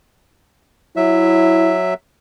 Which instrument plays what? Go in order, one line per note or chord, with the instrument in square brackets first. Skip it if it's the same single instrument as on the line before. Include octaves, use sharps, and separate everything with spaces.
[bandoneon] F#3 E5 [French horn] E4